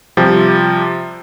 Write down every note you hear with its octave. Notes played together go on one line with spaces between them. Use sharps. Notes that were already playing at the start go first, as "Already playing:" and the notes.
C3 F3 G3